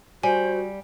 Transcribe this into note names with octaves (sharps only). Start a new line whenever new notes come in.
G3 F#4 C5 G#5